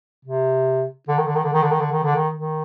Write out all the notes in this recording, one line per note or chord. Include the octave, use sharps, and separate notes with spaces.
C3
D3
D#3
D3
D#3
D3
D#3
D3
D#3
D3
D#3
D3
D#3
D#3